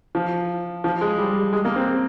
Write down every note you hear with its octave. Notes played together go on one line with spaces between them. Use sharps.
F3
F3
G#3
G3
G#3
A#3
C4